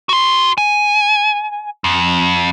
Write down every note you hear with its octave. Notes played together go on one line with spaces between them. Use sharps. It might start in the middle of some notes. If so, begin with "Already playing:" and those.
F#4 C6
G#5
F2